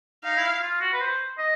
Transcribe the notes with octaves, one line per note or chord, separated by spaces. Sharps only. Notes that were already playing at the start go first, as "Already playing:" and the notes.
D#4 F5
E4
F4
F#4
B4
C5
D#5